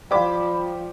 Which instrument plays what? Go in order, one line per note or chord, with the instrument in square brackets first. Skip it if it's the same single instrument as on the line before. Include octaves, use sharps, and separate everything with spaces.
[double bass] F3 [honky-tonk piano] G4 C5 D6 [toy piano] D5 F5 [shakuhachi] B5